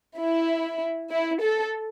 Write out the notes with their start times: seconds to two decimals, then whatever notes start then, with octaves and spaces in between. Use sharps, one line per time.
0.19 E4
1.11 E4
1.42 A4